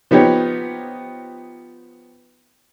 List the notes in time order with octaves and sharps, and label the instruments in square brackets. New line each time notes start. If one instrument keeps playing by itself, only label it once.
[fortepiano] F3 B3 D#4 G4 C#5